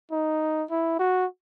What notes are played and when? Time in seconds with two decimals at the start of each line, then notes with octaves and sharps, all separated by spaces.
0.11 D#4
0.70 E4
0.99 F#4